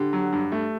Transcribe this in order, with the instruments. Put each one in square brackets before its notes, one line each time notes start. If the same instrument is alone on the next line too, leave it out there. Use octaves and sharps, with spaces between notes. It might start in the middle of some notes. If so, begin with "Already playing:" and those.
Already playing: [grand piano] D3 [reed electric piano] G4
[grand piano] F#3
G2
A3